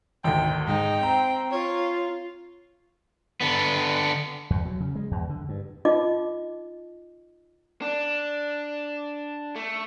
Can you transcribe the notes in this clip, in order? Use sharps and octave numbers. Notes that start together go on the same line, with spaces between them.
G#1 D2 G5
G#2 D#4 G5
C4 A#5
F4 C#5
D3 B3
E2
F#3
C#3
G#3
E2
D3
G2
D#4 F4 D#5 D6
D4
A3